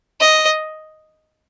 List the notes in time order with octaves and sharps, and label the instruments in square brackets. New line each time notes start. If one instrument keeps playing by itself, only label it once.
[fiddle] D#5